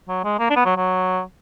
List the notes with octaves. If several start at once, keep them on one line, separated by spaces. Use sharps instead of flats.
F#3
G#3
A#3
D4
B3
F#3
F#3